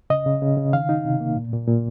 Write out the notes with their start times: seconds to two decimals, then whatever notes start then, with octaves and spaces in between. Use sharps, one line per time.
0.10 C#3 D#5
0.26 C#3
0.42 C#3
0.57 C#3
0.73 D#3 F5
0.89 D#4
1.05 C3
1.20 A#3
1.37 A#2
1.53 A#2
1.68 A#2